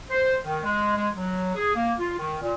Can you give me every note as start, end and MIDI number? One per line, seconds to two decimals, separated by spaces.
0.10 0.36 72
0.44 0.63 51
0.63 0.92 56
0.96 1.09 56
1.15 1.54 54
1.55 1.75 68
1.75 1.93 58
1.99 2.15 65
2.18 2.37 51
2.41 2.54 46